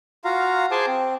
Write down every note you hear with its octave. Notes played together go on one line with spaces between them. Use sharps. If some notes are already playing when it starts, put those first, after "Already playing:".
F4 F#4 F5 A#5
G#4 C5 G#5 A5 D6
C4